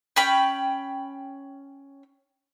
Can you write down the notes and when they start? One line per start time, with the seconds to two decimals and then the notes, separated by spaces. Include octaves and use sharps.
0.16 C#4 G5 B5